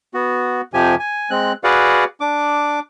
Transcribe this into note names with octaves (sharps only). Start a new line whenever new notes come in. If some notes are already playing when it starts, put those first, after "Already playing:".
B3 F#4
F2 C3 F3 G4 G#5
G#5
G#3 C4 F#6
F#4 G#4 B4 D5 F5 F#5
D4 D6